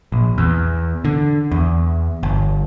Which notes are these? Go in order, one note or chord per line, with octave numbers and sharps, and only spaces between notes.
A#1
E2
D3
E2
G1